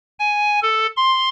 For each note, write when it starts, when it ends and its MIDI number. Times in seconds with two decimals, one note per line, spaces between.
0.19 0.60 80
0.62 0.87 69
0.97 1.29 84